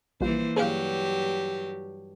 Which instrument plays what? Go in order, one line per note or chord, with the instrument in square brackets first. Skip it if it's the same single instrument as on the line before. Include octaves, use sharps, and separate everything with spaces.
[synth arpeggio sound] A#1 G3 F4 [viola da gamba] E3 A#3 C5
[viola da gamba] G2 F#3 G4 [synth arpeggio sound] G#4 B4 F5